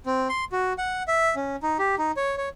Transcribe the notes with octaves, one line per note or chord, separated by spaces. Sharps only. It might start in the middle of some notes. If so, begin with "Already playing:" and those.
C4
C6
F#4
F#5
E5
C#4
D#4
G4
D#4
C#5
C#5